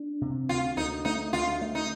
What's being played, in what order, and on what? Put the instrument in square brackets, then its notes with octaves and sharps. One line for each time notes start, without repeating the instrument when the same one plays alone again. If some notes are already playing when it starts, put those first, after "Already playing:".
Already playing: [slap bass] D4
C3
[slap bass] D2 [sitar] F4
[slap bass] D2 [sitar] D#4
[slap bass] A3 [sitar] D#4
[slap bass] D2 [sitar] F4
[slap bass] A3
[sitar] D#4